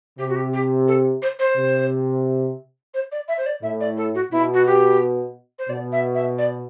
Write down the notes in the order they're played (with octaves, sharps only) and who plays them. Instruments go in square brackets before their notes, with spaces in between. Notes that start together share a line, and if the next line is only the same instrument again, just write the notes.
[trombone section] C3 [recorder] G4
[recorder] F#4
G4
G4
A4
C5
C5
[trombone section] C3
[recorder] C5
D5
E5
C5
D5
[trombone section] A2 [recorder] E5
[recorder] D5
A4
F#4
[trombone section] B2 [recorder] E4
[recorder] F#4
G4
C5
[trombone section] B2 [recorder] D5
[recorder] E5
E5
D5